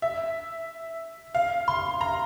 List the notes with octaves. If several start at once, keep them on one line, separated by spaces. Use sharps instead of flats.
E5
F5
C6
A#5